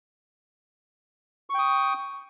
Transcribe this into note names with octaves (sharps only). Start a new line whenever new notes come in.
G5 C#6 D#6